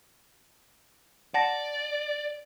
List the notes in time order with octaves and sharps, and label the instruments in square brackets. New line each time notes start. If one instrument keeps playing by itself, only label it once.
[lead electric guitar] D5 [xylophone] F#5 A5 A#6